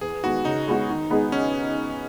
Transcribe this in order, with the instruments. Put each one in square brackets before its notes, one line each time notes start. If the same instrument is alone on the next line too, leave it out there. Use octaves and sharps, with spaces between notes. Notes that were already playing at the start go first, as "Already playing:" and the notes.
[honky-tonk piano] E2 [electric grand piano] G#4
[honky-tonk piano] D#3 G#3 B3 [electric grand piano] F#4
[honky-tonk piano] C#3 [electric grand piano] D#4
[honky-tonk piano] G#3 B3 F#4
D#3
G#3 B3 D#4 G#4
[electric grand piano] C#4